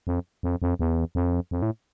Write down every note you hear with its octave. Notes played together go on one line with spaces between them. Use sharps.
F2
F2
F2
E2
F2
F2
A2